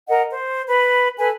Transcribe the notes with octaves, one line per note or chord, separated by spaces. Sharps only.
A#4 D#5 F#5
C5
B4 B5
A4 B4 G#5